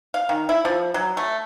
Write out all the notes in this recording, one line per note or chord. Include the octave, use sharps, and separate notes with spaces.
F5
D#3
E4
F3
F#3
A3